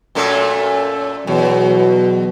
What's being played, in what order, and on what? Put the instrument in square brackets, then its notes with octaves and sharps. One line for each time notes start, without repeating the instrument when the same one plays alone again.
[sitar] F#2 A#2 A3
[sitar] E2 [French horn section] B2 F#3